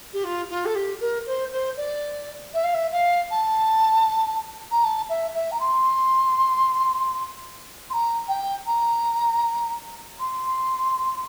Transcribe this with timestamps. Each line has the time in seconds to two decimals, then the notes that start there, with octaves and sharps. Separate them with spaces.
0.13 G4
0.24 F4
0.49 F4
0.65 A4
0.75 G4
1.00 A#4
1.26 C5
1.52 C5
1.77 D5
2.54 E5
2.63 F5
2.74 E5
2.92 F5
3.30 A5
4.71 A#5
4.84 A5
5.09 E5
5.35 E5
5.51 A#5
5.60 C6
7.90 C6
7.93 A#5
8.28 G5
8.66 A#5
10.19 C6